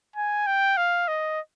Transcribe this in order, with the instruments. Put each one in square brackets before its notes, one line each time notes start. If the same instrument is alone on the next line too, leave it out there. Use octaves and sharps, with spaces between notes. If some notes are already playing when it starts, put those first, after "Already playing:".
[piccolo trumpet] G#5
G5
F5
D#5